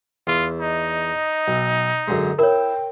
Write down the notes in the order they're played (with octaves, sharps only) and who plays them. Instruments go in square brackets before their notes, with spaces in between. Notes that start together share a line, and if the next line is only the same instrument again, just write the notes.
[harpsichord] E2 [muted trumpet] F4
[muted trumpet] D#4 [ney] D#5
[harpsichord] B1
F#2 D3 G#3
[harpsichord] E4 [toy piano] A#4 C#5 [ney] G5